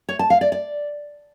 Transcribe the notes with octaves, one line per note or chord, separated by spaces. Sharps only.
C#5
A5
F5
D5
D5